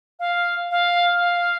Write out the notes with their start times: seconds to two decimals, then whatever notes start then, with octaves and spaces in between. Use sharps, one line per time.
0.19 F5
0.71 F5
1.20 F5